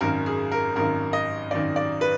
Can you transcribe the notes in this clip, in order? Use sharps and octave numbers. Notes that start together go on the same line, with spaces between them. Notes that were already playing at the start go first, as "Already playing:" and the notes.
G#1 F#2 D#3 A#4
G#4
A#4
G#1 F#2 D#3 A#4
D#5
G#1 F#2 D#3 D5
D5
B4